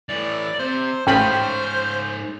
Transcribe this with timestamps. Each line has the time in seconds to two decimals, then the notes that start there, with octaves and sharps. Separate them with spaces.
0.09 A2 E3 D5
0.59 C3 C5
1.07 A1 G#2 C#3 C#4 C5 G5 B5